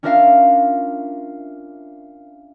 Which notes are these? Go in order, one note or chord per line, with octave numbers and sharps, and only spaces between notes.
C#4 D4 F4 A#4 E5 F5